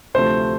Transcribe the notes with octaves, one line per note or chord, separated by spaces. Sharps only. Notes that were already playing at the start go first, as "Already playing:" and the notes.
D2 C3 F3 A3 C5